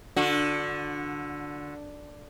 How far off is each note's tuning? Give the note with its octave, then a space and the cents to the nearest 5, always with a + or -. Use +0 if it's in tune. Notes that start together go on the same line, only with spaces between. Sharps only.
D3 +0 F#4 -35